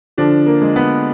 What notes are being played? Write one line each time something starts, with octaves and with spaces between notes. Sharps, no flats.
D3 F3 D4
A#3
G#3
B3